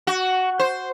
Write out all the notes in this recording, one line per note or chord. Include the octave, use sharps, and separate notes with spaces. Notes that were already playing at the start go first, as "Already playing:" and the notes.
F#4
C5